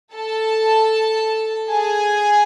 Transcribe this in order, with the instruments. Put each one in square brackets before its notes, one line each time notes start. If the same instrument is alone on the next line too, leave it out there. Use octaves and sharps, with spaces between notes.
[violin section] A4 A5
G#4 G#5